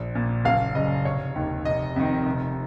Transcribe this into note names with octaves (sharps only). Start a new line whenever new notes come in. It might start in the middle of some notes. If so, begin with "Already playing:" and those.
Already playing: A#1
A#2
F#1 F5
F#2 C#3 D#5
F1 C#5
D#2 D#3
F1 D#5
F2 D#3
F1